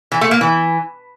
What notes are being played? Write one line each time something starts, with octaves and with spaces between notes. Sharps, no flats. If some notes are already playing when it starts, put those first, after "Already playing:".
E3
A3
A#3
E3